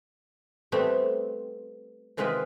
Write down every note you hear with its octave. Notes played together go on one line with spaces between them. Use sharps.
G3 A3 B3 C4
C3 D#3 G#3 F4 B4